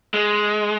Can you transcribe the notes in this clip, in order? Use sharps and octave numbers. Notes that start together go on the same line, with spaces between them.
G#3